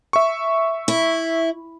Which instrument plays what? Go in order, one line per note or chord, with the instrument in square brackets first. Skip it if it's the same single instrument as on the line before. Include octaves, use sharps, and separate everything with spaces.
[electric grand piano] E5 C#6
[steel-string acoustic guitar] E4